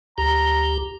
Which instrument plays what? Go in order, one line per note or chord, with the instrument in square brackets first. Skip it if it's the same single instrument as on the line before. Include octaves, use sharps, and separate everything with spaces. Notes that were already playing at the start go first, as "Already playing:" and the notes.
[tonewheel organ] D2 G4 [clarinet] A#5